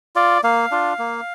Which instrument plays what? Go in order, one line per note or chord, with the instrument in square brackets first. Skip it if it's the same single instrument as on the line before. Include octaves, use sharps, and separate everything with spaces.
[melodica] F4 D5
A#3 F5
D4 F4
A#3